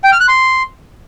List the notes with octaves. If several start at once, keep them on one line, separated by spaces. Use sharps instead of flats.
G5
F6
F#6
C6